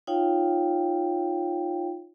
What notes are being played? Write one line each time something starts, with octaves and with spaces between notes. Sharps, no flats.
D#4 F4 C#5 F5 G5